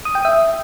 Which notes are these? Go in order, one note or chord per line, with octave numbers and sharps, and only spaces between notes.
D#6
G5
E5